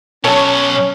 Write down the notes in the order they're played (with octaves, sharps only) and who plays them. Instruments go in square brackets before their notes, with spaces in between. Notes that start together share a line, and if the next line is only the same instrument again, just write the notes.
[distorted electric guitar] B2 F#3 [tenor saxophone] C#4 [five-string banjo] A4 A5 [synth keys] C#5